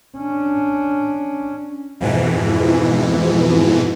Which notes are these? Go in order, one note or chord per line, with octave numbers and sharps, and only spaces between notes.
C#4 D4
F2 G#2 B2 E3